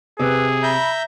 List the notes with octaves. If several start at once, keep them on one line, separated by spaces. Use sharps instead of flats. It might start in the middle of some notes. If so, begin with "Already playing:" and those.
C3 G#4 B4
E5 A#5 B5 G6